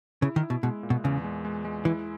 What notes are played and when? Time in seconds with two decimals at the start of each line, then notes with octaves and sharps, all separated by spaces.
0.22 C#3 E4
0.36 D#3
0.43 E4
0.50 B2
0.63 B2 G#3
0.83 A#2
0.90 B2
1.04 E2 C#3
1.24 G#3
1.45 G#3
1.65 G#3
1.85 E3 E4